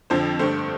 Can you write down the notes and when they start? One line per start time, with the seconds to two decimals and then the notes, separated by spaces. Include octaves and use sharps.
0.10 F2 D3 F3 C5
0.39 G2 D3 A3 C5